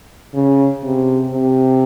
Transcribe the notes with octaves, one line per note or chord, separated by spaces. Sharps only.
C#3
C3
C3